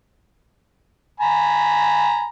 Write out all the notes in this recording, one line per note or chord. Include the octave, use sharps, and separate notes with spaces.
G#5 A#5 B5